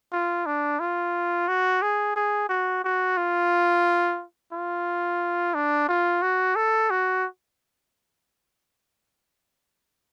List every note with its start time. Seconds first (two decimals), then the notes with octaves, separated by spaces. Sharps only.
0.12 F4
0.46 D4
0.80 F4
1.48 F#4
1.82 G#4
2.16 G#4
2.49 F#4
2.84 F#4
3.17 F4
4.52 F4
5.55 D4
5.88 F4
6.22 F#4
6.56 A4
6.91 F#4